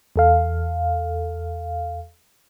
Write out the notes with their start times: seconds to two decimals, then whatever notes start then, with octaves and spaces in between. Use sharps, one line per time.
0.16 E2 A4 F5